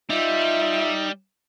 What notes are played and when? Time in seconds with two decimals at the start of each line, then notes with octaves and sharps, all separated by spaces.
0.10 G3 D#4 F4 E5